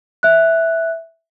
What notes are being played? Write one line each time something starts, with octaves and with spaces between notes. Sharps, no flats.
E5 F#6